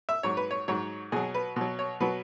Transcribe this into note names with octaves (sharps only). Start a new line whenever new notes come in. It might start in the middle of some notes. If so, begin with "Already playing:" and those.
E5
G#2 F#3 C#5
B4
C#5
G#2 F#3 C#5
B2 F#3 G#4
B4
B2 F#3
C#5
B2 F#3 B4